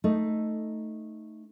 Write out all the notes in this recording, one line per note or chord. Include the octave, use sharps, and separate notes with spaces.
A3 D#4